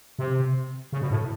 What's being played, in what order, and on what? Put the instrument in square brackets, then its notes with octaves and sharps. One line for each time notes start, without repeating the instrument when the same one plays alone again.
[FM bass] C3
C#3
B2
A2